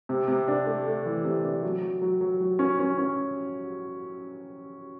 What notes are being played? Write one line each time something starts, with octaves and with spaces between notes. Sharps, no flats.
C3
C3
D4
A3
A3
E3
C3
D4
F#3
F#3
F#3
F#3
F#3
C#4
C#4
C#4